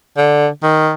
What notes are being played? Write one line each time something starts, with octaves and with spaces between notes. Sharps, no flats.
D3
D#3